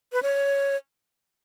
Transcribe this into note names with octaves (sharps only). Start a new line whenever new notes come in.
B4
C#5